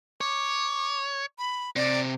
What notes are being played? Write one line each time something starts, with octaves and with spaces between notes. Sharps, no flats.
C#5 D6
B5
C3 D5